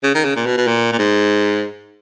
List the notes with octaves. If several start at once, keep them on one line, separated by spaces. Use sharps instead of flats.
C#3
D#3
C#3
A#2
B2
B2
A#2
A#2
G#2